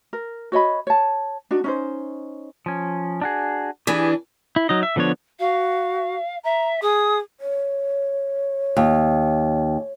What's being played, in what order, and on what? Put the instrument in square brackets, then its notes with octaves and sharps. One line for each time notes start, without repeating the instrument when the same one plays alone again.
[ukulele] A#4
F#4 C#5 D#5 B5
C#5 A5
D4 D#4 F#4
C#4 D#4 C5
[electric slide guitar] F3 C#4
D4 F#4 G#4
[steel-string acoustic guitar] E3 D4 [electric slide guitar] G4 G#4 B4
[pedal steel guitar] E4
F#3 D#4 D#5
E5
D3 F3 B3 D4 C#5
[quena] F#4 [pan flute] F5
[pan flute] E5 [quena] A#5
[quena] G#4 [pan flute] D#6
[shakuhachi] C#5
[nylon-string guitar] D#2